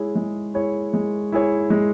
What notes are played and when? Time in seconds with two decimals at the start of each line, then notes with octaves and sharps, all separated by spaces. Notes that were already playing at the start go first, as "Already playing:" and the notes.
Already playing: G#3 E4 G#4 C#5
0.16 G#3
0.54 E4 G#4 C#5
0.94 G#3
1.32 E4 G#4 C#5
1.70 G#3